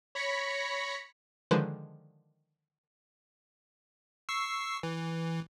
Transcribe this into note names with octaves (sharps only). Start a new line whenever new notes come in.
C#5 B5 A#6 B6 C#7
D3 D#3 F3 G#3 B4 C5
C#6 E6 C7
E3